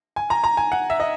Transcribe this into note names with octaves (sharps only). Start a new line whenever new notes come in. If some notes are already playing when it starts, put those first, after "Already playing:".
G#5
A#5
A#5
G#5
F#5
E5
D#5